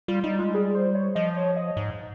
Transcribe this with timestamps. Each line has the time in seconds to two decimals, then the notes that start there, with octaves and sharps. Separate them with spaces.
0.08 G3 F4
0.24 G3 D#4
0.39 G#3 F4
0.54 G3 G#4
0.75 C5
0.95 C#5
1.15 F3 D#5
1.37 C#5
1.57 D#5
1.77 G#2